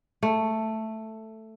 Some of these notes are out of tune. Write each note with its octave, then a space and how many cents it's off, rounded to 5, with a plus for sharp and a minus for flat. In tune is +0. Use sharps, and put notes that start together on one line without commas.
A3 +5